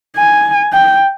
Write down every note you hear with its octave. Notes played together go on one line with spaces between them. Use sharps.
G#5
G5